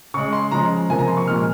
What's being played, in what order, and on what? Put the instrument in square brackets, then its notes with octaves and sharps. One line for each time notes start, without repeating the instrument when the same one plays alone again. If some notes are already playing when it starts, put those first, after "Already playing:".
[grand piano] C#3 G#3 C#6
C6
C#3 F3 G#3 A#5
C3 F3 A#3 G#5
A#5
C6
C#6
A#2 F3 G#3 F6